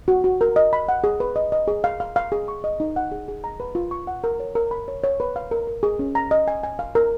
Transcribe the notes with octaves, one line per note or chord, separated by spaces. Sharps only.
F#4
F#4
A#4
D#5
B5
F#5
G#4
B4
D#5
D#5
G#4
F5
F5
F5
G#4
C#6
D#5
D#4
F#5
G#4
G#4
A#5
B4
F4
C#6
F#5
A#4
C#5
A#4
B5
C#5
C#5
B4
F5
A#4
A#4
G#4
C#4
A#5
D#5
G#5
G#5
F5
A#4